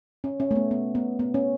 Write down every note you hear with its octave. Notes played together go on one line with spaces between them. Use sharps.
C#4
C#4
A3
B3
B3
B3
B3
C#4